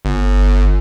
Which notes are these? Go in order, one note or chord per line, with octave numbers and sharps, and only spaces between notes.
G1